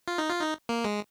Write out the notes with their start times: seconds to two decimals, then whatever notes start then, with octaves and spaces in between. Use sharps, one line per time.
0.08 F4
0.18 D#4
0.30 F4
0.41 D#4
0.69 A#3
0.84 G#3